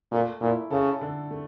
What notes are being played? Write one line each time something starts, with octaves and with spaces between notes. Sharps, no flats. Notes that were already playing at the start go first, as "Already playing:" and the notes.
A#2 A3
A#2 E4
C#3 A4
D3
A3